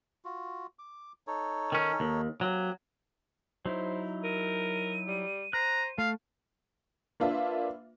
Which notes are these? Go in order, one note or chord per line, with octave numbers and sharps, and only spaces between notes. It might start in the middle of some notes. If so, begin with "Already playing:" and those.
F4 F#4
D6
D#4 A4 C#5
D#3 C#4
D#2
F#3 A#3 C4 G4
F#3 D#4 E4 C5
A#4 D#7
G3
C5 A#5 F#6
A3 F5
A#3 D4 F4 B4 E5